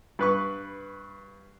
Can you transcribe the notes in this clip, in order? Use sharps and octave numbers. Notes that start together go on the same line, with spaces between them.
G2 B4 C#6